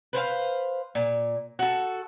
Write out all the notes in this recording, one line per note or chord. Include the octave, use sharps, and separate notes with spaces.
B4 C5 E5 F5
A#2
F#4 A4